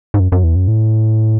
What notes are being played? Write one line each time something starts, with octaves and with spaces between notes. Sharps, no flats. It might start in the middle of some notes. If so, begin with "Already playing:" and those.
G#2
F#2
F#2
E2
F#2
A2